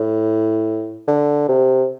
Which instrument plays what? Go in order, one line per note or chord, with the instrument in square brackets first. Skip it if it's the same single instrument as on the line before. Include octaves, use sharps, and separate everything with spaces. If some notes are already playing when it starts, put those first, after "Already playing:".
Already playing: [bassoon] A2
D3
C3